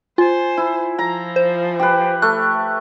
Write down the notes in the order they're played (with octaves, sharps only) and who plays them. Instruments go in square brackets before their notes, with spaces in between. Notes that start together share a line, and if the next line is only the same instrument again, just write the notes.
[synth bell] F4 [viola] C5 [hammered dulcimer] G#5
[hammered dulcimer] E4
[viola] F3 [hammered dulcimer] A#5
[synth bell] C5
[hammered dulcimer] G4 B4
[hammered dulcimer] A3 [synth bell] F#6